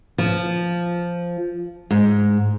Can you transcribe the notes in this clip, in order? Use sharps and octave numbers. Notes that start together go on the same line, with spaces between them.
F3
G#2